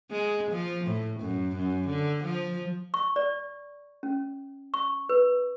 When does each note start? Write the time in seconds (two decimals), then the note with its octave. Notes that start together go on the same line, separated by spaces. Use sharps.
0.11 G#3
0.51 F3
0.87 A2
1.20 F#2
1.56 F#2
1.87 D3
2.24 F3
2.94 C#6
3.16 D5
4.03 C#4
4.74 C#6
5.09 B4